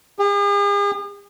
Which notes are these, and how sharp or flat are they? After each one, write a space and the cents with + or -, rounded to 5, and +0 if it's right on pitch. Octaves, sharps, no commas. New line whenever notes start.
G#4 -45